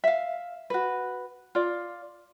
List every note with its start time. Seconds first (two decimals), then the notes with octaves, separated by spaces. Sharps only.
0.04 E5 F5
0.70 F#4 B4
1.55 F4 D5